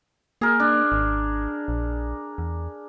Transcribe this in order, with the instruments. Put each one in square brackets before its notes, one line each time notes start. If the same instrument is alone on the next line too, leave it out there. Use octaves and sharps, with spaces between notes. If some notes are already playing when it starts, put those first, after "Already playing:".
[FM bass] A#3 [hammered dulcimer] G#4 A#4
[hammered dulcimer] D4
[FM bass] G#1
A#1
E2